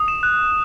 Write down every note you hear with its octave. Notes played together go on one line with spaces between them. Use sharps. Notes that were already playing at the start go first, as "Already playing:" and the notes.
Already playing: D#6
E7
F#6